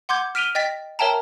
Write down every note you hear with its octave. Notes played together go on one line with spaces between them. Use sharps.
F#5 C6 D6 G6 G#6
F6 B6 D7 D#7 F7 G7
D#5 G5 A6 B6
A#4 C#5 E5 G5 A5 A#5